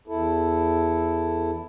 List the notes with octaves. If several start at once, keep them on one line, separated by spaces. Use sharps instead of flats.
E2 E4 A4